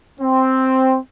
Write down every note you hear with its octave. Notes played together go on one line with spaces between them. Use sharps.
C4